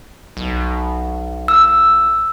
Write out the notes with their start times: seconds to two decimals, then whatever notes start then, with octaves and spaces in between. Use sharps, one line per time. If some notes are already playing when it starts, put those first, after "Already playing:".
0.37 B1
1.48 E6